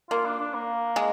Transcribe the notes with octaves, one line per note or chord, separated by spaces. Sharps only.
A#3 F4
D4
D4
A#3
G#3